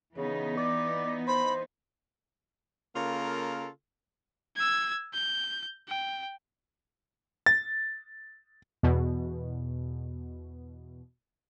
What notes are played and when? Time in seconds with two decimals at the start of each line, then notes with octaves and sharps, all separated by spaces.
0.18 C#3 E3 B3 D#4
0.57 D5
1.27 C5 B5
2.96 C#3 A#3 F4 A4 A#4
4.56 E6 G#6
5.14 G6
5.88 G5
7.46 A6
8.83 E2 B2